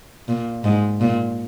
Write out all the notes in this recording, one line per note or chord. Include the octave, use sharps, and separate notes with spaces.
A#2
G#2
A#2